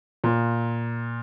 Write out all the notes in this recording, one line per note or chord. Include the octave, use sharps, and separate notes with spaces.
A#2